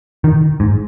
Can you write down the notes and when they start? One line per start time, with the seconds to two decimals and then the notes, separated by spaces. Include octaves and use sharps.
0.24 D#3
0.60 G#2